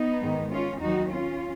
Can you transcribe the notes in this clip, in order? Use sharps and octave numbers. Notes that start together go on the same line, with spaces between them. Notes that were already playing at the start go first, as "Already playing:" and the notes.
Already playing: B3 D#4
G#2 D#3 G#3
C#4 F4
D#2 D#3 F#3 D#4 F#4
C#4 F4